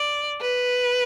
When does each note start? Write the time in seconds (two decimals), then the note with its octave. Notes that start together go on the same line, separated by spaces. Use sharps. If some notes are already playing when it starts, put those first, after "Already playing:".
Already playing: D5
0.41 B4